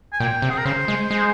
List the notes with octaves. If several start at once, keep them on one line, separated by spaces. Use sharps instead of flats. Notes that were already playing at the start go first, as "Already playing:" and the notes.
G#5
A#2 G5
C3
G#4
A#4
C#3 C5
G#3
G#3